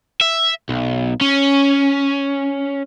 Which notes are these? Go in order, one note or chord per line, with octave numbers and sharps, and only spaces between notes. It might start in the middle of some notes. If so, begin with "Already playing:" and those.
E5
B1
C#4